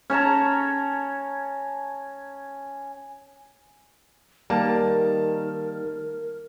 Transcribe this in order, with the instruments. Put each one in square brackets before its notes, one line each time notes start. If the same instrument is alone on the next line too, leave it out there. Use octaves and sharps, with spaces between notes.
[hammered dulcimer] C#4 C#5 A5 A#5
[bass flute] D#3 [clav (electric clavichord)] G3 A#3 [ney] A#4 [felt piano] A5